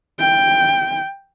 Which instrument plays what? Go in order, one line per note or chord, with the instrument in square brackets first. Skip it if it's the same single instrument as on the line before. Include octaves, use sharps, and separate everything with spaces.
[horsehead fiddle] G5